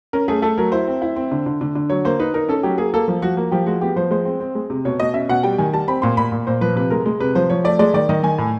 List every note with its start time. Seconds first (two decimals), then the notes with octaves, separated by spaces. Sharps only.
0.13 C#4 A#4
0.28 A3 G#4
0.42 A3 A4
0.58 F#3 A#4
0.72 E4 C5
0.88 C4
1.02 E4
1.16 C4
1.32 D3
1.46 D3
1.61 D3
1.75 D3
1.90 F#3 C#5
2.05 A#3 C5
2.19 D#4 B4
2.34 D#4 A#4
2.48 C#4 A4
2.63 F#3 G4
2.78 A#3 G#4
2.94 A#3 A4
3.08 F3
3.22 F3 F#4
3.37 A#3
3.51 F3 G4
3.66 G#3 F#4
3.81 B3 G4
3.96 F3 C5
4.11 G#3 C5
4.25 C4
4.40 C4
4.55 G#3
4.70 C3
4.85 B2 C#5
5.00 B2 D#5
5.14 C#4 E5
5.29 B2 F#5
5.43 G3 G5
5.58 D#3 G#5
5.73 G3 A5
5.88 C4 B5
6.02 A#2 C6
6.17 A#2 B5
6.32 A#2
6.47 A#2 C5
6.61 F3 B4
6.76 C3 B4
6.90 G#3 A#4
7.06 G#3
7.20 C3 B4
7.35 F3 C5
7.50 F3 C#5
7.64 A3 D5
7.79 G#3 D5
7.94 D#3 D5
8.09 D#3 D#5
8.23 D#3 G#5
8.38 A2